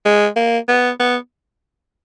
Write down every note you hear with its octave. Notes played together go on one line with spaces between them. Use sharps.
G#3
A#3
B3
B3